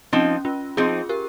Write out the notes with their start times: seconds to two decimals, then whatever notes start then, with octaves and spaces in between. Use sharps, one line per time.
0.13 F3 C4 C#4 D#4
0.45 C#4 F4
0.77 F3 C4 D#4 F4 G#4
1.09 G4 A#4